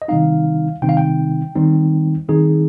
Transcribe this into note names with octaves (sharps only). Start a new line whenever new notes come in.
D#5
C3 D#3 G3 C4 D#4 F5
C3 D#3 G3 C4 D#4 G5
F5
G5
D#3 G3 C4 D#4
D#3 G3 C4 D#4 G#4